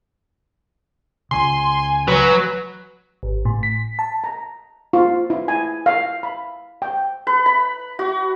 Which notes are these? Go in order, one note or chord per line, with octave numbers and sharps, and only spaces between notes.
C#2 C#3 G#5 C6
F#3 B4
G#1
A2
B6
A5
A#5
F4
E4
G#5
F5
B5
G5
B4
B5
F#4